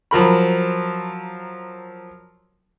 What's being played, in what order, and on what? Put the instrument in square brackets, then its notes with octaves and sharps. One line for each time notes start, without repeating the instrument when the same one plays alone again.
[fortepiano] F3 F#3 A#4 B5